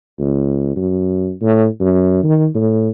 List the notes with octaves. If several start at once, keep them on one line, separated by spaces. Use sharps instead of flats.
C#2
F#2
A2
F#2
D#3
A2